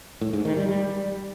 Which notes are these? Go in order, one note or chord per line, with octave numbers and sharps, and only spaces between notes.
A2
G#2
D#3
G3
G3